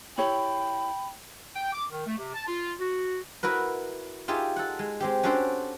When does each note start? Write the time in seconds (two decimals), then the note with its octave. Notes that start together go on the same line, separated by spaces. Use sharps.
0.18 E4 G4 C#5 G5 B5
1.55 G5
1.72 D6
1.90 D#3
2.06 A3
2.18 C3
2.34 A5
2.46 F4
2.79 F#4
3.43 E4 F#4 A#4 B4
4.28 D#4 F4 G4 G#4 E5
4.56 A4 F#5
4.79 G#3
5.00 G#3 C4 G4
5.23 C#4 D4 F#4 A4 C5 G5